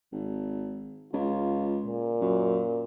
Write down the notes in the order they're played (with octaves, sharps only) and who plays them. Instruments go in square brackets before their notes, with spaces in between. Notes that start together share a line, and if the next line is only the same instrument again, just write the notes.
[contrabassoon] G#1
[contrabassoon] C#2 [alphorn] F4
[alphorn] A#2
[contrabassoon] F#2